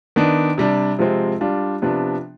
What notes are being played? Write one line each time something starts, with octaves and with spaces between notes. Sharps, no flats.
D#3 B3 D4
C3 G3 D4
C3 F3 G#3 C4
G3 D4 F4
C3 F3 B3 D4